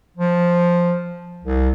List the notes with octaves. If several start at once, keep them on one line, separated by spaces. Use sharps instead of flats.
F3
C2